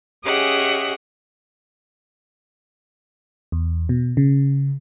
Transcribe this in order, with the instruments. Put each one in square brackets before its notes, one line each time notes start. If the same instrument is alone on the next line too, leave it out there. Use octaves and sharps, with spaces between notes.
[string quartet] C#4 G4 G#4 D#5 E5 F#5
[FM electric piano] E2
B2
C#3